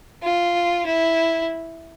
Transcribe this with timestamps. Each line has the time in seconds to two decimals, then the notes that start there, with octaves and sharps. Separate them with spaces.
0.23 F4
0.86 E4